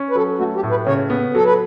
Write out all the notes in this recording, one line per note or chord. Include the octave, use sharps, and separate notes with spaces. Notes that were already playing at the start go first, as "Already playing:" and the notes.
Already playing: C#4
B4
F#3 A4
A3 F#4
G4
A2
B4
C#3 C#5
B3
F#3 A4
B4